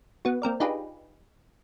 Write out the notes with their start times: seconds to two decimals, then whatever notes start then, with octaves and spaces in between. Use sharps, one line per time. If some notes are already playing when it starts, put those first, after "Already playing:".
0.25 B3 F#4
0.42 A#3 C4 A#4 D5
0.60 D4 D#4 F4 G4 G#4 B4